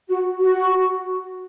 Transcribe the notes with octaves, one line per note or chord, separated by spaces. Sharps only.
F#4
F#4